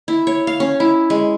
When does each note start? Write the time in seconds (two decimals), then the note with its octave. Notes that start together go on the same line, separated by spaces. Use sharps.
0.08 E4
0.27 C#5
0.47 F5
0.60 C#4
0.80 E4
1.10 G#3